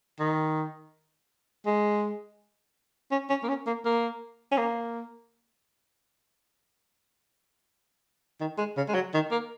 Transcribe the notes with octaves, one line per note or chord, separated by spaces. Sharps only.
D#3
G#3
C#4
C#4
A#3
C#4
A#3
A#3
C#4
A#3
D#3
G#3
C#3
G#3
F#3
D#3
A#3